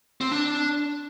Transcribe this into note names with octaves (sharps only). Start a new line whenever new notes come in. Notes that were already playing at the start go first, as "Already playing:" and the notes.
C4
D4